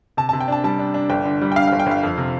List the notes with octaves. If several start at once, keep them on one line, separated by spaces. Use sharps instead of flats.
C3 A5
C3 A5
G5
D4 A5
G3 A5
D4
D4
G1 G5
D3
G3
G5
D3 F5
F5
G1
G5
G1 F5
F2
C3